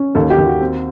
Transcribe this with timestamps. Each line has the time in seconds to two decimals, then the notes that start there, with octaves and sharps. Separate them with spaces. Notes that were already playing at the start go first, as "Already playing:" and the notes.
Already playing: C#4
0.15 D#2 A4
0.30 G4
0.38 D#2
0.46 F#4
0.61 C4